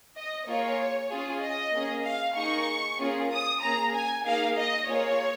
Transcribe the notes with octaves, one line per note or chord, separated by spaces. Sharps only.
D#5
A#3 F4 G#4 C#5
C#4 F4 G#4
D#5
A#3 C#4 G#4
F5
A#3 D#4 G#4 C#6
A#3 C#4 F4 G#4
D#6
A#3 C#4 G#4 A#5
G#5
A#3 D#4 G#4 F5
D#5
A#3 F4 G#4 C#5